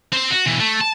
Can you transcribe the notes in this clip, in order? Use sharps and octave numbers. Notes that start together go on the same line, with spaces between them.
C4 C5
F#4
B2 E3
A3
A5